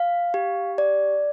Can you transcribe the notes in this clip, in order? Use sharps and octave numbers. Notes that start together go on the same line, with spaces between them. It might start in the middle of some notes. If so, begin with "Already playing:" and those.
Already playing: F5
G4
D5